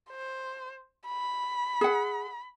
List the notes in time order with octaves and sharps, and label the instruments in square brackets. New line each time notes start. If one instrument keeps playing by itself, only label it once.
[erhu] C5
B5
[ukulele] G#4 F#5